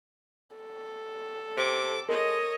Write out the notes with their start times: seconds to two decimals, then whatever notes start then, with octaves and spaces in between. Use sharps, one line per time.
0.56 A4
1.57 C3 D6
2.09 G#3 A#4 C#5 D#5